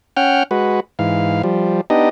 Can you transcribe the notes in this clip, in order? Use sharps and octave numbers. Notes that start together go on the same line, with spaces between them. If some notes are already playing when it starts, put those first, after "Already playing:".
C#4 F#5 G5 F6
G#3 F#4 B4
G#2 E3 F5
F3 G3
B3 D4 D#4 G4 D#5